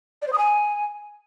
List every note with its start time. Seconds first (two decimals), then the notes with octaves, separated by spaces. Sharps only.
0.22 D5
0.27 C5
0.33 D#6
0.38 G#5